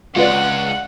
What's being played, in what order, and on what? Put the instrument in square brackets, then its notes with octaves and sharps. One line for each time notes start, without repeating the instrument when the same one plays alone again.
[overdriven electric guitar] C#2 G#3 [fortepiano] F4 B4 D5 [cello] F#5